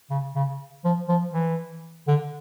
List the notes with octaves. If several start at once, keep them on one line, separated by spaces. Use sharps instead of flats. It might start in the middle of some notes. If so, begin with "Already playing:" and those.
C#3
C#3
F3
F3
E3
D3